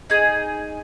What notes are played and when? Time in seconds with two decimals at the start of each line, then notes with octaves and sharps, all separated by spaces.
0.10 D#4 G#4